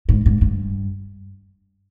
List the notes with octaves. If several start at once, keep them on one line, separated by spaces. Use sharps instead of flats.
G#2
G#2
G2